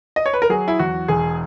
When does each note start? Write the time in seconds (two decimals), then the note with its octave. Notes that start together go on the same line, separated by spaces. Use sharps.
0.16 D#5
0.26 C#5
0.33 B4
0.42 A#4
0.50 F#3 G#4
0.68 E4
0.79 E2 F#4
1.08 E1 G#4